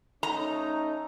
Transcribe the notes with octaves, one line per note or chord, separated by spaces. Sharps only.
A3 C#4 D#4 A#5